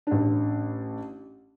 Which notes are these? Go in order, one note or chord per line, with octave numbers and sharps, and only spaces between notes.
A1 D4